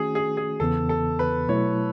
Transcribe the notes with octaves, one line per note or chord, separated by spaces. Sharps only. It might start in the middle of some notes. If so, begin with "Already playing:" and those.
Already playing: D#3 A3 C#4 F#4 G#4
G#4
G#4
E2 C#3 E3 B3 A4
A4
B4
B2 F#3 A3 E4 C#5